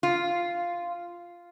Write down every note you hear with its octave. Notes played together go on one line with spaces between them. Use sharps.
F4